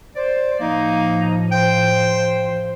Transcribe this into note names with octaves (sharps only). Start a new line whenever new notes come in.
C5 D5
A2 F3 A#3 D#4
C5 G5